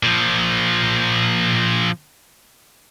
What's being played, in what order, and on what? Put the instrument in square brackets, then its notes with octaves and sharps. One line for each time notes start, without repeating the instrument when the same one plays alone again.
[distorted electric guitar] A#2 F3